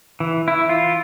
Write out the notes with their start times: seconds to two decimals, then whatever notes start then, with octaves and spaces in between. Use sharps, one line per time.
0.20 E3
0.48 E4
0.69 F4